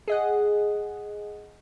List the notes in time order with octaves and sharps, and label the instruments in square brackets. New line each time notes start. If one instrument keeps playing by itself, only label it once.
[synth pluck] G#4 D#5 F#5